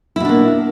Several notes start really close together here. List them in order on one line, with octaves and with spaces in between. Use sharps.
E4 B2 D4 A#3